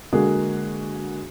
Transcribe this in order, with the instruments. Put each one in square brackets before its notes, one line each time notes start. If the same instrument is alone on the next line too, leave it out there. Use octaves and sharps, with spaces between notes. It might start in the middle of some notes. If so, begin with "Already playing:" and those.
[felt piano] D3 G#3 A#3 F#4 G#4